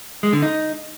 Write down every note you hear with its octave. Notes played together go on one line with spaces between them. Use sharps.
G#3
D3
D#4